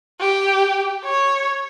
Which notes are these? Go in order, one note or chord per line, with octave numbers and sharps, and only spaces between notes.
G4
C#5